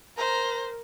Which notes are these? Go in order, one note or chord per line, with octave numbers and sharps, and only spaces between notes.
A#4 C5 A#5